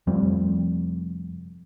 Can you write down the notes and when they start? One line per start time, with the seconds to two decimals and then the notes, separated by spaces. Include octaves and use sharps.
0.07 F1 F2 G3 C4